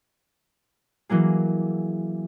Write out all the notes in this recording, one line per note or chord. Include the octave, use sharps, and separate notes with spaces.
E3 F#3 A#3 G#4